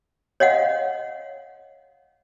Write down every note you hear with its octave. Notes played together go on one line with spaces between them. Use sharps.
C#5 D#5 F5 F#5